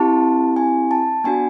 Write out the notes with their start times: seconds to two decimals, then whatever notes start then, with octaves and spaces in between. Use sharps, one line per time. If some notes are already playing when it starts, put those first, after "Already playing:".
Already playing: C4 E4 G4 A5
0.56 G#5
0.91 A5
1.24 B3 D4 F#4 G#5